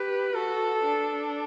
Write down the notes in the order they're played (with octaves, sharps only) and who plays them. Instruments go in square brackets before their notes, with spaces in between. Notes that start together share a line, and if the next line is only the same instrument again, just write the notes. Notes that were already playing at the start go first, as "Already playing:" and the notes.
Already playing: [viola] G4 [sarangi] B4
[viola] F#4 [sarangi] A4
[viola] D4